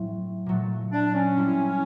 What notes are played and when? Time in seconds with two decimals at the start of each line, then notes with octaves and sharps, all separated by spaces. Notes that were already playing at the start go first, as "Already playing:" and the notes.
Already playing: A2 F#3 A3 C4
0.46 A#2 F#3 A3
0.92 D4
1.15 C#4
1.37 G3 C4 E4